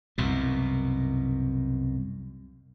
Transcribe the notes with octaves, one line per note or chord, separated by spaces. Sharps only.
C2 F#2 B2